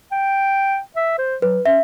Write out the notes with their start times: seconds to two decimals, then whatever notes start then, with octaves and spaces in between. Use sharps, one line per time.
0.12 G5
0.96 E5
1.18 C5
1.42 F#3 B4
1.66 C#4 E5